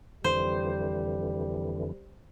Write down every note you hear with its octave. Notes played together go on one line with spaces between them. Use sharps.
F2 D3 E3 G3 C5